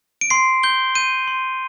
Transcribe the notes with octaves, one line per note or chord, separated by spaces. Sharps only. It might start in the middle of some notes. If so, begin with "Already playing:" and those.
D7
C6 C7
G6 G7
G6 D#7
C6